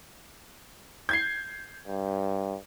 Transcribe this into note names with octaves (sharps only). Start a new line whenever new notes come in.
G6 G#6 C7
G2